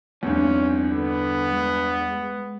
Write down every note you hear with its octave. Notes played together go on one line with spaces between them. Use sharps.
E2 G2 F3 C4 C#4 D#4
D3 B3
G#3